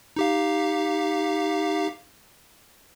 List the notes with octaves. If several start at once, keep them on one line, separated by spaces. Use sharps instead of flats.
D#4 G4 F5